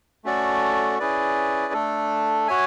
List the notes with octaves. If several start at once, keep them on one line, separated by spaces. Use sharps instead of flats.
A3 C#4 F#4 A4 D5
C#4 E4 G#4 B4 D5
A3 D4 A4
F#4 C#5 E5 G#5